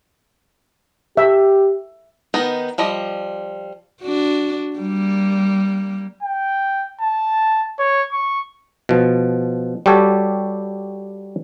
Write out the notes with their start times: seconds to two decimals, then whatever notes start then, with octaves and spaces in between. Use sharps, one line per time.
1.17 G4 E5
2.34 D#3 B3 D#4
2.78 F3 G3 D#5
4.02 D4 F#4
4.77 G3 A#3
6.23 G5
7.02 A5
7.79 C#5
8.13 C#6
8.89 B2 F3
9.86 G3 F#4 G4 A4 C#5